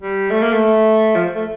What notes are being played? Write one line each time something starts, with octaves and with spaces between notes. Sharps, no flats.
G3
A3
A#3
A3
F3
A3